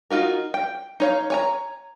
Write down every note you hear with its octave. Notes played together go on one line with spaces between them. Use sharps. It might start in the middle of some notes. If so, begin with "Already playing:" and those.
D#4 F4 F#4 A#4
G5
D#4 C#5 F5
C#5 G#5 A#5